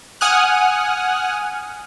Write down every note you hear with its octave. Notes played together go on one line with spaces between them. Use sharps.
F#5 G#5 D#6 F6 F#6